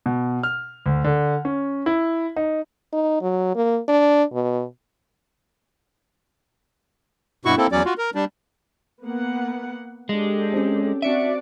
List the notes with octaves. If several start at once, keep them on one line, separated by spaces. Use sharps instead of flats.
B2
F6
D2
D3
C#4
E4
D#4
D#4
F#3
A#3
D4
B2
G2 B2 E4 F#4 C#6
A#3 C4 E4 A4
E2 F#3 C#4 D5
F4 F#4
A#4
G3 D4
A#3 B3 F#5
G#3 D4 G4 A4
C4 C#4
C4 D4 F#4 D5 E5 C#7 D7